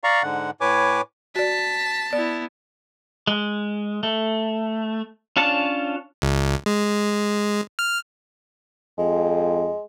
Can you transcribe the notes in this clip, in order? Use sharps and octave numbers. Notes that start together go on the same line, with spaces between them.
D5 F5 A#5 C#6
G#2 D3 F#5
A2 B4 C#5 G#5 D6
F#4 D5 A5 B6
B3 E4 D5
G#3
A3
C#4 D4 F4 C#5 A5
C#2
G#3
F6
F2 G#3